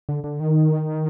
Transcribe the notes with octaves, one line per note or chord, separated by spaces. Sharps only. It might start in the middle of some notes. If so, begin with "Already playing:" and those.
D3
D3
D#3